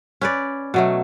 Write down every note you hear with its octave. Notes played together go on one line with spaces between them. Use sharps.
C#4 B4 D5
B2 F#3 A3